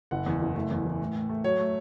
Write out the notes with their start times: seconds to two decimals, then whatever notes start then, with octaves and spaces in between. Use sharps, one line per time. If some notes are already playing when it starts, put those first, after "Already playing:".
0.11 F#1 F#5
0.26 E2
0.41 F#1
0.55 A3
0.71 E2
0.85 E3
1.00 A2
1.15 A2
1.29 A3
1.44 F#3 C#5
1.59 A3